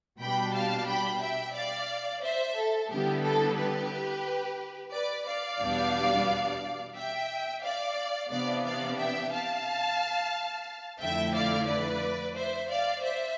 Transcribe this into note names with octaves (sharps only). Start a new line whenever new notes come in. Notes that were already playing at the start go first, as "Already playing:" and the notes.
B2 G3 D4 G5 B5
F5 A5
G5 B5
E5 G5
D5 F5
C5 E5
A4
D3 G3 B3 E4 G4
A4
G4 B4
B4 D5
D5 F5
E2 B2 G3 B3 D4
E5 G5
D5 F5
C3 E3 B3 D4 D5 F5
D5 F5
E5 G5
F5 A5
F2 D3 A3 E4 E5 G5
D5 F5
B4 D5
C5 E5
D5 F5
C5 E5